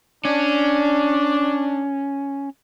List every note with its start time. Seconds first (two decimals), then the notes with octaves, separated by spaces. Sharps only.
0.25 C#4 D4